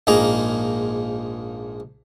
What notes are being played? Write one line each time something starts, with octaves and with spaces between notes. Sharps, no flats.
A#1 G#2 A#3 D#4 G#4 A#5